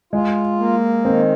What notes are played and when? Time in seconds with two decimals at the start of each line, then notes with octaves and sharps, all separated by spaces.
0.13 G#3 F4
0.59 A#3
1.05 D#3 C4